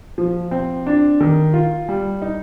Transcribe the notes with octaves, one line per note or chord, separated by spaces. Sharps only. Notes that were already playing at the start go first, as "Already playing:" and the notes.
F3
C4
D4
D#3
F4
G3
D#4